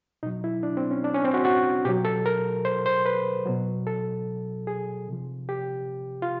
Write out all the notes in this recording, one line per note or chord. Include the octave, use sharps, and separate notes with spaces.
B2 F#3 D#4
E4
D4
C4
C#4
D4
C#4
C4
F#4
F#4
B2 F#3 G4
A4
A#4
C5
C5
B4
B2 F#3
A4
G#4
C3 F3
G4
F4